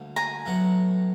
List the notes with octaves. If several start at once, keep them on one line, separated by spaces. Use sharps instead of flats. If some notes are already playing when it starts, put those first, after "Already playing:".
Already playing: D2 D3 G3 A#3
G#5 A#5
A2 F#3 B3